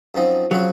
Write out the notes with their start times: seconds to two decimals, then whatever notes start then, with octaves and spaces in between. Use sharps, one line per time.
0.15 F#2 F3 C4 D#4
0.51 C#3 F3 F#3 C4 F#4